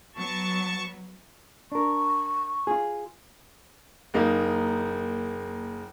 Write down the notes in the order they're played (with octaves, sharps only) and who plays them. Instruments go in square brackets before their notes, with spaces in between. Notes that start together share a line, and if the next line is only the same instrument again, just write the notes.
[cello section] F#3 B3 [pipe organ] A5 C#6
[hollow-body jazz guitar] D4 A#4 [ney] C#6
[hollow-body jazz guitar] F4 G#4
[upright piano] F#1 A#3 D#4